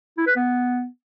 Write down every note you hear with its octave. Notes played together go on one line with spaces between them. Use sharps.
E4
B4
B3